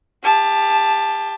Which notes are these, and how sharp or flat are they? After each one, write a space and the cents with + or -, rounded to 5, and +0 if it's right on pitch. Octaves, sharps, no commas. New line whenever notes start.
G4 +30 A5 +0